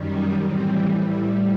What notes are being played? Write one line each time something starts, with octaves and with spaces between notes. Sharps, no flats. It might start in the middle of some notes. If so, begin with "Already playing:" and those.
Already playing: F#2 D#3 G3
D#4
A2 E3 G3 C4
A2 G3 E4